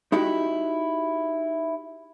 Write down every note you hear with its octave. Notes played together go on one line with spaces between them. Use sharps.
D#4 E4 F#4 G4 E5